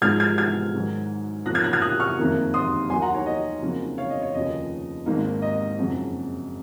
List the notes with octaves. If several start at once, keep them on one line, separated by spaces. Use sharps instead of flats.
G#2 F3 G#3 D#4 F6 G#6
F6 G#6
F6 G#6
G#2 D#3 F#3
F2 C3 F3 A#3 C#4 F#6 A#6
F6 G#6
F#6 A#6
F6 G#6
D#6 F#6
C#6 F6
F#1 F2 D#3 A#3 D#4
C6 D#6
D#2 D#3 F#3 G#5 C6
F#5 A#5
C#5
D#5
F2 C#3 F#3 A#3 D#4
C#5 F5
D#5
C#5
F1 D#2 C#3 F3 D#5
G#1 G#2 D#3 A#3 D#4
D#5
F#1 F2 C#3 F#3